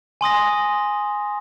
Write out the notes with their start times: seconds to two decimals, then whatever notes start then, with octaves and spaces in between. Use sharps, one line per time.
0.21 G#5 C6 D#6 A#6